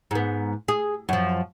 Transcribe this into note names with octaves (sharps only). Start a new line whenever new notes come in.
G#2 B3
G#4
F#2 F3